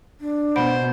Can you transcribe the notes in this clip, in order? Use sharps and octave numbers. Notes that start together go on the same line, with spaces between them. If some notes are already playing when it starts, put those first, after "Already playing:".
D4
B2 C5 F#5 B5 D7